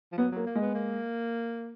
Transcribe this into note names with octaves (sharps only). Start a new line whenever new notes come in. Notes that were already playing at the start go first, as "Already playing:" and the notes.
F3
F#3 B3
F#3 A#3
A#3
G#3
B3
A#3